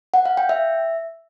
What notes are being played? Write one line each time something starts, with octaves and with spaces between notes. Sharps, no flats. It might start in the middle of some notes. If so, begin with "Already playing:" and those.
F#5
F5
G5
E5